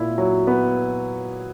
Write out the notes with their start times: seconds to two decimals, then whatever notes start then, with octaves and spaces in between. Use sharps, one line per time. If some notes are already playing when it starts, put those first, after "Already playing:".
Already playing: A#2 E4
0.18 F#3
0.47 B3